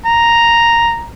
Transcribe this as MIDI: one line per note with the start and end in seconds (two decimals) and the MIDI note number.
0.06 1.05 82